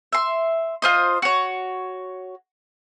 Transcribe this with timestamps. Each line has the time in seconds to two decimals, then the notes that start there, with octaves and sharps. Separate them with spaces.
0.13 E5 C6
0.82 F4 C5 D#5
1.22 F#4 C#5